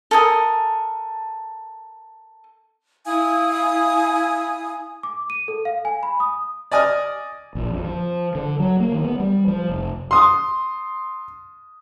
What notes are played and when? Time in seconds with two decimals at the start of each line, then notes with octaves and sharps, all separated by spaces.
0.11 A4 A#4 G#5 D#6
3.05 E4 F5 G#5 D#6
5.03 D6
5.30 D#7
5.48 A4
5.65 F5
5.85 G#5
6.03 B5
6.20 D#6
6.71 D5 D#5 G#5 D#6 F6
7.55 A#1
7.71 F2
7.85 F3
8.35 D3
8.59 F#3
8.80 A#3
8.92 D#3
9.05 B3
9.20 G3
9.48 F3
9.69 F1
10.11 C6 D#6